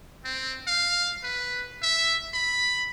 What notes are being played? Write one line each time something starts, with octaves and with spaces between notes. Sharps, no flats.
C4
F5
B4
E5
B5